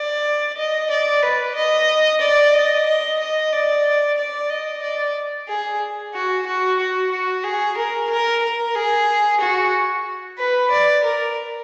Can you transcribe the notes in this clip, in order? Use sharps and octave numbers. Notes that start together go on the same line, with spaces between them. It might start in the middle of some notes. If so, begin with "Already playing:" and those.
Already playing: D5
D#5
D5
B4
D#5
D5
D#5
D#5
D#5
D5
D5
D#5
D5
G#4
F#4
F#4
F#4
F#4
G#4
A#4
A#4
A#4
G#4
F#4
B4
D5
A#4